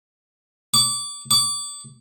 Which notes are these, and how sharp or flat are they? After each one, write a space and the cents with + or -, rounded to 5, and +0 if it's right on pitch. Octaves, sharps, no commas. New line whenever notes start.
D6 -30
D6 -30